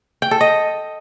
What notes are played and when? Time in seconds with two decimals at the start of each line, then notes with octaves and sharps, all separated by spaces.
0.22 G5
0.31 A4
0.41 D#5